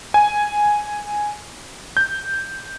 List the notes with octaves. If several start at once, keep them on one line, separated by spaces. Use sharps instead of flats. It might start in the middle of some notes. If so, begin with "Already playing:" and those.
G#5
G6